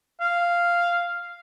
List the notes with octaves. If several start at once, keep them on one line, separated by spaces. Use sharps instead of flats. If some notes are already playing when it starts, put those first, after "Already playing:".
F5